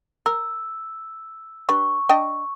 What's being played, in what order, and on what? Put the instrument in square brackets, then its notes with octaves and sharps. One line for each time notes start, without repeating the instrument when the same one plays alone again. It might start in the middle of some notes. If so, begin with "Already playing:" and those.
[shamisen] A#4 [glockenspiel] E6
[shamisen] D4 G4 B4 [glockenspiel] C#6
[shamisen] D4 D#5 G5